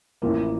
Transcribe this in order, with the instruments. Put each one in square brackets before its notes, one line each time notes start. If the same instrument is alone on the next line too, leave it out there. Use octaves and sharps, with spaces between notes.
[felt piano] A1 A2 F3 A#3